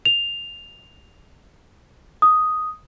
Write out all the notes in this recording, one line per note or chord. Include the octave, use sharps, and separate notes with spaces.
F7
D#6